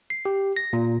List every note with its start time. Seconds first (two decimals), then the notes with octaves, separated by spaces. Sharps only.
0.10 C7
0.25 G4
0.56 A#6
0.73 A#2